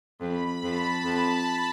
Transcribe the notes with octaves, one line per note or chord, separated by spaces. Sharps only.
F2 B5
F2 A5
F2